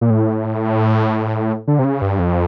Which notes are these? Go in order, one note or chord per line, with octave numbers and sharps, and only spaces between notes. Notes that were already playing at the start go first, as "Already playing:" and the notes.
A#2
A2
D3
C3
C#3
G2
F2